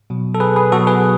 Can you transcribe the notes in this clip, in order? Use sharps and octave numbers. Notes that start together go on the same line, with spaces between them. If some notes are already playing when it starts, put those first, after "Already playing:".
B2 F#3
A4
G#4 B4
G#4 B4
B2 F#3 F#4 A4
G#4 B4